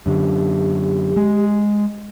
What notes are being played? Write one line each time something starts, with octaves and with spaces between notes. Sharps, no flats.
F#2 D3 G4
G#3